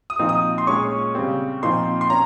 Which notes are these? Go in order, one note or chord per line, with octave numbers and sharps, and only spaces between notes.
D#6
A#2 F3 C4 D#4
D#6
C6
A#2 G#3 C#4 C#6
C#3 G3 C4
A#2 F3 C4 D#4 C6
C6
C#4 A#5